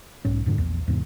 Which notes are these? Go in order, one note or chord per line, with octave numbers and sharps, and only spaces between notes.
B1 G#2 C#4
F2 G#2 D3
A#1 E2
E2 G#2 C3